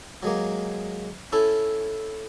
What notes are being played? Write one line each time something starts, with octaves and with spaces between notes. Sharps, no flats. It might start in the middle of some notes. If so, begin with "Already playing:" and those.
F#3 G#3 A#3
C#4 E4 A4